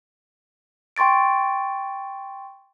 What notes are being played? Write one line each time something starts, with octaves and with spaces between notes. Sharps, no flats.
G5 C6 C#6 A6 D7